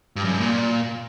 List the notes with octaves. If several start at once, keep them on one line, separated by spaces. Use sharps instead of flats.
G2
F#2
G2
A#2